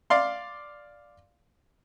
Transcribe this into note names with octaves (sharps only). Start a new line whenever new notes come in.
D5 F5 C6